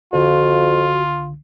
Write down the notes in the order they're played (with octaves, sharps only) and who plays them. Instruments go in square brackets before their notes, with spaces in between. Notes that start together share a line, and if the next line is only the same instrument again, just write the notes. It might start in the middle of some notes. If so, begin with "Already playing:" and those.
[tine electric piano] C2 D3 [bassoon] F2 [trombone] F4 [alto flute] F#4